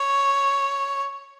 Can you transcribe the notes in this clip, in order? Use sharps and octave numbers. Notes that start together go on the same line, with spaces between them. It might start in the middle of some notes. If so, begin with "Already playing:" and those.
Already playing: C#5